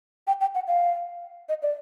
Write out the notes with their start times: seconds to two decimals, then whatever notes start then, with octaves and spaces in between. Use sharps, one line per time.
0.27 G5
0.41 G5
0.55 F#5
0.68 F5
1.49 D#5
1.62 D5